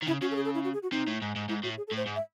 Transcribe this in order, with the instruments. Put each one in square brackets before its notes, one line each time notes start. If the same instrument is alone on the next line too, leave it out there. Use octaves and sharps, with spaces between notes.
[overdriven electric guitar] D#3
[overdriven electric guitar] C#3 [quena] E4
[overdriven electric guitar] C#3 [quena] F#4
[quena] A4
G#4
A4
E4
F#4
G#4
F#4
[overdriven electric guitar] C3 [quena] D#4
[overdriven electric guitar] A2
G#2
G#2
[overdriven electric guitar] G#2 [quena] E4
[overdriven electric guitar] A2 [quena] F#4
[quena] G#4
A4
[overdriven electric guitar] A2 [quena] C5
[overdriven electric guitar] G#2
[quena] E5